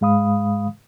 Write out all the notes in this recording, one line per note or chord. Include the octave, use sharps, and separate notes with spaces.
G#2 G#3 F5 B5 D#6